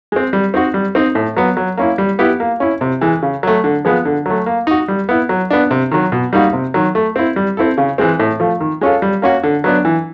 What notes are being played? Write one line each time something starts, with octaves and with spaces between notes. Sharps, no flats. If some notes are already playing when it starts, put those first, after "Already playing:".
G#3 C4
G3
C4 D#4 F#4
G3
C4 D#4
A2
F#3 B3
F#3
A#3 C#4 E4
G3
B3 E4 G4
A#3
C#4 E4
C3
E3 G#3
C#3
F#3 A3
D3
F3 G#3 B3
D3
F#3 A3
A#3
D#4 F#4
G3
B3 E4
F#3
B3 D4
C3
D#3 F#3
B2
G3 A#3 D#4 F#4
C3
D#3 F#3
A3
C4 E4
G3
C4 E4 A4
C#3
E3 G#3 C4
A2
F3 A3
D#3
G#3 C#4 F4 A4
G3
A#3 C#4 F#4
D3
F#3 B3 D4
E3